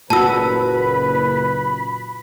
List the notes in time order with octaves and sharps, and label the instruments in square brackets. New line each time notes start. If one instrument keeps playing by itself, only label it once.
[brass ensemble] F#1 B4 [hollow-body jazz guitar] A#2 F#4 [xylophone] A5 E6 [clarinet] B5